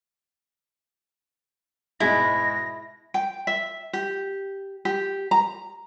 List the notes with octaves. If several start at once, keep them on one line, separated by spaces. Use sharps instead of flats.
G#2 B2 G#3 E4 A#6
G5
E5
G4
G4
A#5